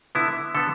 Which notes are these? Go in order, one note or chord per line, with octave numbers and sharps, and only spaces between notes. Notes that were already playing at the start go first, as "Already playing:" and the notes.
D3 B3 E4
D3 B3 A4